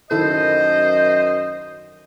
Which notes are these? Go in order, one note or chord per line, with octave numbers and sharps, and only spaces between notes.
F#2 D#3 E4 A4 C5 D#5